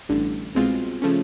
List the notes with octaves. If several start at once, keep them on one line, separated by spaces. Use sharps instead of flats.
A1 G2 D3
C2 B2 G#3 C4 F4
C#3 F3 A3 C#4